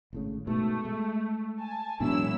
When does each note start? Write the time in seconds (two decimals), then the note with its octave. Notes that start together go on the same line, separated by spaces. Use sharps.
0.13 G#1 A2 C#3
0.47 G#2 B2 A3
0.85 G#3
1.59 G#5 A5
2.00 E1 A2 F#3 D4 E4 E6